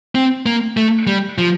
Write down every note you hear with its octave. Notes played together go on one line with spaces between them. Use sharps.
C4
A#3
A3
G3
F3